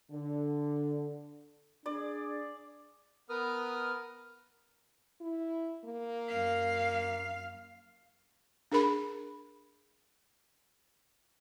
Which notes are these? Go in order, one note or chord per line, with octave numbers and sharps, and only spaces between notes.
D3
D4 G#4 D5
B3 A#4 B4 D#6 F6
E4
A#3
F#2 F5
D4 G#4 A#4 B5